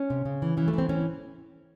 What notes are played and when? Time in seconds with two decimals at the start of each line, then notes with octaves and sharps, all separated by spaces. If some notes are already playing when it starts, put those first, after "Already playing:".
Already playing: C#4
0.10 C3
0.25 C#3
0.42 E3
0.57 E3 C#4
0.68 A3
0.73 E3
0.78 C4
0.89 E3 C#4